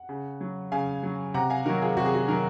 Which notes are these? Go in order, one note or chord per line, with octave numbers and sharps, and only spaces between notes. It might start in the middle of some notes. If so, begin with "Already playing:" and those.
Already playing: F#5
C#3
F#3
C#3 F5 G#5
F#3
C3 F#5 A#5
F5 G#5
D#3 F#3 F#4 A#4
F4 G#4
C3 F#4
G#4
F#4
D#3 F#3 A#4